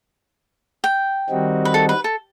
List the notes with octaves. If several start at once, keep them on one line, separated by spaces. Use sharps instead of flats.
G5
D#3 G3 C4 D#4 F#4
B4
A4
B4
A4